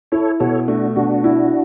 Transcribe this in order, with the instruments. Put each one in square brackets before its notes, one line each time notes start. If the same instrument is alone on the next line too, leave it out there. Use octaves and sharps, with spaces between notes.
[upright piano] E4 [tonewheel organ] A4 C#5
[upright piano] B2 [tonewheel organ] A4 C#5
[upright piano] A3 [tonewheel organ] D4 F#4
[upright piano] B2 [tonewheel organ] D4 F#4
[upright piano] E4